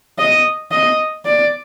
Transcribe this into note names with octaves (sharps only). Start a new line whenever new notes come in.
D#5
D#5
D5